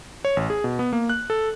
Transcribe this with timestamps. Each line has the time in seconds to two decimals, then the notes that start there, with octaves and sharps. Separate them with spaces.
0.25 C#5
0.37 A1
0.50 G#4
0.64 B2
0.79 B3
0.93 A#3
1.09 F#6
1.30 A4